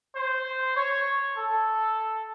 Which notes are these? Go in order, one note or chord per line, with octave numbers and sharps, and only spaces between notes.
C5
C#5
A4